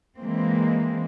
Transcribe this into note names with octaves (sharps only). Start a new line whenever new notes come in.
E3 G#3 A#3 C4